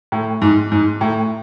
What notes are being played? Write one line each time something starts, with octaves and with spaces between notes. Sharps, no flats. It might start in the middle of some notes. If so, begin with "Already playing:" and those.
A2
G#2
G#2
A2